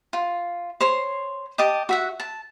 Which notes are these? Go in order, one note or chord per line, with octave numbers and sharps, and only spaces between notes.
F4
C5 C#5 C6
G4 D#5 A5 D6
F#4 E5 F#5
A5